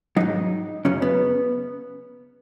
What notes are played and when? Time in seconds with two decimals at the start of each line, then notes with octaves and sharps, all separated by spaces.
0.16 G#2 F#3 D#4
0.85 F#2 C#3 F#3 C#4
1.02 B3